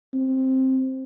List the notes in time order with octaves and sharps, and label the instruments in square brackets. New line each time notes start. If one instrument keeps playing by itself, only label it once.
[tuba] C4